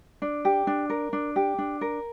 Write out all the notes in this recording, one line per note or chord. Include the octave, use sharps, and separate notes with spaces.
D4
G4
D4
A#4
D4
G4
D4
A#4